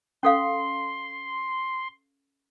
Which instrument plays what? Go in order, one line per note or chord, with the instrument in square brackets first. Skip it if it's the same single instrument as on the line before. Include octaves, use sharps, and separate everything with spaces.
[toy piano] C#4 A4 F5 [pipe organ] C6